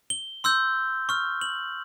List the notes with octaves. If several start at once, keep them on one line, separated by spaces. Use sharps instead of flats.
G7
C6 E6 G6
C#6 F6
F#7